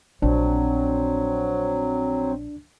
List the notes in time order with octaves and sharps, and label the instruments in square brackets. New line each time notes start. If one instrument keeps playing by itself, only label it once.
[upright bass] A#1 [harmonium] F#3 [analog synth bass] C4 [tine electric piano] D4